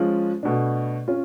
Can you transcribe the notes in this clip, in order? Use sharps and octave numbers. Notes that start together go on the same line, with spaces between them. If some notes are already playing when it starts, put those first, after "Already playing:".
Already playing: F3 G#3 C#4 F4
B2 A3 D4
C#4 F4